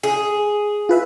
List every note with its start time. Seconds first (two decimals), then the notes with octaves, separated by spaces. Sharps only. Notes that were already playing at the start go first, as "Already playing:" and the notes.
0.03 G#4
0.89 F4 B4 E5